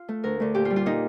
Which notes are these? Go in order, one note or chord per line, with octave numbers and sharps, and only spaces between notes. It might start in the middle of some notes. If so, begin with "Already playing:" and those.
Already playing: F4
A3
D2 A#4
D3 A3
A#2 G4
F4
G3
F4
A#2 D#4